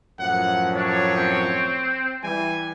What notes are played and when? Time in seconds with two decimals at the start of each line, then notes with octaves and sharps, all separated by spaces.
0.19 F#2 A2 F3 F#5
0.75 D4 C#5
1.15 C4
2.23 E3 G3 G#5